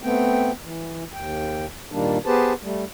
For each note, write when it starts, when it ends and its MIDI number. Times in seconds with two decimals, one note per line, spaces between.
0.03 0.51 57
0.03 0.51 59
0.03 0.51 60
0.03 0.51 79
0.64 1.04 52
1.13 1.66 39
1.13 1.66 79
1.92 2.18 46
1.92 2.18 51
1.92 2.18 55
1.92 2.18 58
1.92 2.18 62
2.26 2.53 59
2.26 2.53 67
2.26 2.53 68
2.26 2.53 71
2.26 2.53 72
2.26 2.53 81
2.62 2.84 55
2.62 2.84 57